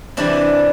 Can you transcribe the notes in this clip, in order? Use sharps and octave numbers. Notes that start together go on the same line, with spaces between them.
C3 E3 G3 D4